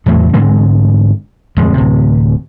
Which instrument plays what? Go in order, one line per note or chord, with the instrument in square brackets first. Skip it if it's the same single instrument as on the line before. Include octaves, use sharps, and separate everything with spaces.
[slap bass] E2 A2 C3 F#3
G#2 D3 G#3 C4
D1 F2 G#3
D1 C3